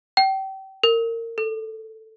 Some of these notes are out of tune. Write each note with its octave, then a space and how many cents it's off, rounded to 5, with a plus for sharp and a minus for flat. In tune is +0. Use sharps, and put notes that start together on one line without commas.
G5 -30
A#4 -25
A4 +5